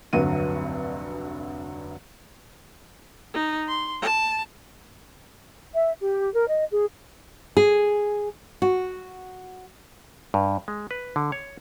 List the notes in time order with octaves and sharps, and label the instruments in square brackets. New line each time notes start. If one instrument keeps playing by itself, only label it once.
[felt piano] F1 D2 G2 F#3 F#4 D#7
[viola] D#4
C6
A5
[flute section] E5
G4
A#4
D#5
G#4
[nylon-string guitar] G#4
F#4
[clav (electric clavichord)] G2
G#3
B4
D3
C#5